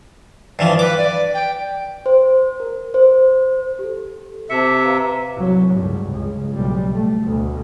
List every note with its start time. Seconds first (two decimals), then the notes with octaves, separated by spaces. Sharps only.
0.59 G2 E3 F3
0.79 B4 D6
0.97 D5
1.34 G5
2.06 C5
2.60 A#4
2.94 C5
3.79 G4 A4
4.50 C3 E5 A5 C#7
4.85 B4 F5 A#5
5.36 C2 F#3
5.74 C#2 G2
6.11 C#2
6.54 B1 G3
6.93 A3
7.24 D2 B2